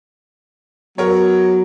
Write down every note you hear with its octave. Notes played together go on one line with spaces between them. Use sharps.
F#3 B3 A#4 C#5